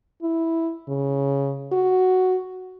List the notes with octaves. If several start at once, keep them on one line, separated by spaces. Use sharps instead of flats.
E4
C#3
F#4